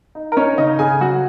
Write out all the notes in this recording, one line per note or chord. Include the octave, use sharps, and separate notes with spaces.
D#4
A#4
C#4 D#4 C#5
C#3 D#4 D#5
C#3 G#4 G#5
F#3 F#4 F#5